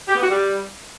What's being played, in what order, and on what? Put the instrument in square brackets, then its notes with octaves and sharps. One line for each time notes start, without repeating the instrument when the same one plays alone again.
[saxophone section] G4
B3
F#4
G3